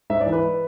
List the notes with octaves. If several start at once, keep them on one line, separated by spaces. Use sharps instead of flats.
G#2 E5
D5
E3
B4